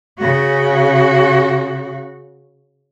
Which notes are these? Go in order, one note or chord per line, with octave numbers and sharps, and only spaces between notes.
C#3 F#4